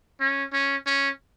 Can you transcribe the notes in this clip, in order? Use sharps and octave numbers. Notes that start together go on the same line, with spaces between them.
C#4
C#4
C#4